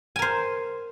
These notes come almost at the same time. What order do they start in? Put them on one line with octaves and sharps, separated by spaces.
G#5 A#4 C5